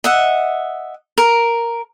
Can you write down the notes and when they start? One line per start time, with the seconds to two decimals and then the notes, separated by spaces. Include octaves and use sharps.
0.04 D#5 E5 F#5
1.18 A#4